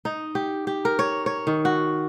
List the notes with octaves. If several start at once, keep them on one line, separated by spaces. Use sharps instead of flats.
D#4
G4
G4
A#4
C#5
C#5
D#3
F#4